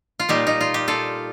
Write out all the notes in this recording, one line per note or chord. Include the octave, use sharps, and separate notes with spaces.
F4
A#2 G3 D#4 G4
D#4
F4
G4
F4 A4